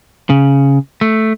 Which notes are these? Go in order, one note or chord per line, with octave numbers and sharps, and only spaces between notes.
C#3
A3